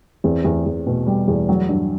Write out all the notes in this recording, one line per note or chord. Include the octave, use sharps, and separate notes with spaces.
E2 C4
E2
E2
B2
G3
E2
F#3
G2